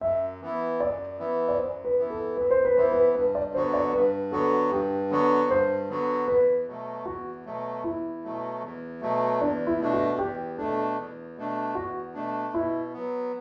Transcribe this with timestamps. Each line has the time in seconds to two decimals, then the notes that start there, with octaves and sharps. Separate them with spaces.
0.01 F#2 E5
0.41 E3 B3 E4
0.80 F#2 D5
1.19 E3 B3 E4
1.49 D5
1.58 F#2 C5
1.85 B4
1.98 E3 B3 E4
2.10 A4
2.37 F#2 B4
2.50 C5
2.65 B4
2.76 E3 B3 E4 C5
2.92 B4
3.14 G2 B4
3.35 D5
3.53 D3 F#3 B3 F#4 C5
3.73 D5
3.93 G2 B4
4.32 D3 F#3 B3 F#4 A4
4.72 G2 G4
5.10 D3 F#3 B3 F#4
5.50 G2 C5
5.89 D3 F#3 B3 F#4
6.27 E2 B4
6.67 B2 F#3 A3
7.06 E2 F#4
7.45 B2 F#3 A3
7.84 E2 E4
8.24 B2 F#3 A3
8.62 E2
9.01 B2 F#3 A3
9.41 E2 D4
9.67 E4
9.80 B2 A3 D4
9.93 F#4
10.18 E2 G4
10.57 B2 A3 D4 A4
10.98 E2
11.36 B2 A3 D4
11.75 E2 F#4
12.14 B2 A3 D4
12.54 B2 E4
12.93 F#3 B3